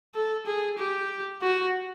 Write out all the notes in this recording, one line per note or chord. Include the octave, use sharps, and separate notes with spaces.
A4
G#4
G4
F#4